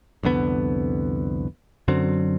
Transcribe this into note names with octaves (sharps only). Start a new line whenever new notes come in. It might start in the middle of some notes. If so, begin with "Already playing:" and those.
C2 F2 D3 B3
F#2 D3 F#3 C4